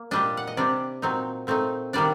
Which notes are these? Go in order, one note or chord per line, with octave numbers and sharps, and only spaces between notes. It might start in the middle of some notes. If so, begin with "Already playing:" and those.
Already playing: A#3
A#2 G3 D4 D#5
F#5
D#5
C3 G3 D4 D5
A#2 F#3 C4 D#4
A#2 A3 C4 D#4
D#3 G3 A#3 D4 D5